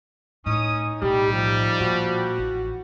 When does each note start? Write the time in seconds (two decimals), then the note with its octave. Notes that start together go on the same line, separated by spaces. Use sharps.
0.46 A2 C#4 D#4 D#6
1.02 B1 A2 G3 G4
1.33 F3
1.80 A#2 F#4
2.38 A1